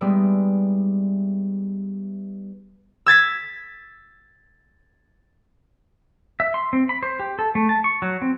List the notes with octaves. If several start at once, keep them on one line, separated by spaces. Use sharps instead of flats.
G3 G#3 B3 D#4 D5 E5
E6 G#6 A6 B6
E5
C6
C4
B5
C5
G4
A4
A3
A5
C#6
F#3
C4